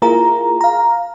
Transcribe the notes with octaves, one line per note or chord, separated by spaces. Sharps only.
A#3 E4 F4 G#4 A#4 A#5
F5 A#5